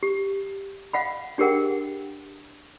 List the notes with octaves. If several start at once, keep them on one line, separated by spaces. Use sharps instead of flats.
G4
F5 F#5 B5
D4 G4 G#4 A#4 F#5 G5